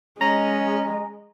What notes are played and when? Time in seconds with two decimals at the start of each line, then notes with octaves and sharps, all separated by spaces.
0.21 G#3 C#4 D#5 A#5